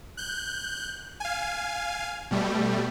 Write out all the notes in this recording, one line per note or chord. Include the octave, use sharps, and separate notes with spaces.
F#6 G6
F5 G#5
B2 G3 A3